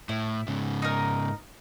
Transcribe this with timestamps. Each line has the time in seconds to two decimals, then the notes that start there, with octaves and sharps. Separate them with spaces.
0.09 A2 E4
0.48 G#2 C#3
0.82 D#4 A#4